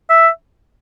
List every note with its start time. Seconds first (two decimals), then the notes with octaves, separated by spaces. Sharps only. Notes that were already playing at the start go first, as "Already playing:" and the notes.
0.10 E5